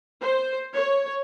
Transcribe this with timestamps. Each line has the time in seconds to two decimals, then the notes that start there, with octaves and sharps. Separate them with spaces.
0.21 C5
0.74 C#5